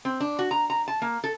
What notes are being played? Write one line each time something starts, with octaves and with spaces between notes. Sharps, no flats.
C4
D4
F#4
A#5
A#5
A5
A#3
A4